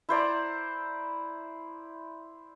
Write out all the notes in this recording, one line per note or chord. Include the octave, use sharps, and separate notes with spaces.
E4 C5 D5 A#5